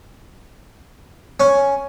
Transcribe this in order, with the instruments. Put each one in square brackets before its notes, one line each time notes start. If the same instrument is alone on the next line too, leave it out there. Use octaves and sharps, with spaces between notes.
[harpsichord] C#4